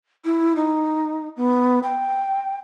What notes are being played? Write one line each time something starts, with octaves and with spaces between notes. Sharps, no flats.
E4
D#4
B3
G5